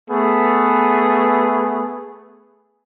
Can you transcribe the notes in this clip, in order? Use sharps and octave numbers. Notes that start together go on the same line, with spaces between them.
A3 B3 G#4